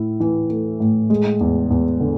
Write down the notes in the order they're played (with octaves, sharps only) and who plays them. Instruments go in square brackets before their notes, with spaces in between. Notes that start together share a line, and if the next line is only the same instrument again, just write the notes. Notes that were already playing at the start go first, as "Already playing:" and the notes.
Already playing: [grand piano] A2 E4
E3
A3
A2
G#3
E2
E2
D3